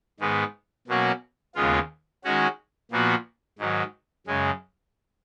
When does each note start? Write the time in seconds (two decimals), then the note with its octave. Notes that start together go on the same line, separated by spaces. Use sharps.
0.20 G#2 D#3 G#3 B3
0.88 B2 F#3 A#3 C#4 F#4
1.55 D#2 C#3 G#3 B3 F4
2.24 D#3 G#3 C#4 F#4
2.92 A#2 F3 B3 F#4
3.59 G#2 D#3 F#3
4.26 F#2 C#3 G#3